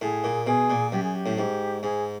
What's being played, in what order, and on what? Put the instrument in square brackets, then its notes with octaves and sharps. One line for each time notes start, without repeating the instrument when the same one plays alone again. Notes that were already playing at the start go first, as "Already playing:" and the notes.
[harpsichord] A2 [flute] G#4
[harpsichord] A#2
[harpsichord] B2 [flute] G#4
[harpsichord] A#2
[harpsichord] F#2 [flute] G4
[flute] G#4
G4
[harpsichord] A2
[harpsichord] G#2 [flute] G4
[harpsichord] G#2 [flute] G#4